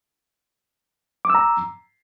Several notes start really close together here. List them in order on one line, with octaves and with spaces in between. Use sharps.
D6 E6 A#5